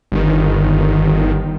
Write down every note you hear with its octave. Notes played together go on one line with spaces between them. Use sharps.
G1 D#3